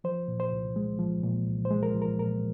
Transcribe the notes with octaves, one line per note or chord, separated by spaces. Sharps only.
F3 C5
A#2
C5
C2
G#3
F3
A#2
C2
C5
G#3
A#4
F3
A#4
A#2 A#4